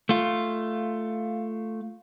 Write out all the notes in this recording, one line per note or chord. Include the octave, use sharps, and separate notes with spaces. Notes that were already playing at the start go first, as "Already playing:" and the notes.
A3 F4